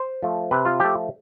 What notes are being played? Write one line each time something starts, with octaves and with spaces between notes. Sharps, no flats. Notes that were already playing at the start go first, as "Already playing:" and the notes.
Already playing: C5
F3 A3
C3 B4
F4
F3 A3 G4